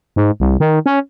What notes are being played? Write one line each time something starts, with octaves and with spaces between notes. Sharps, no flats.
G#2
C2
D#3
C#4